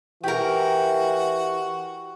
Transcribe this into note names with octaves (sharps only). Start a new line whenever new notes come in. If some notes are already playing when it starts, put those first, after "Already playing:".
E3 F#4 G4 A#4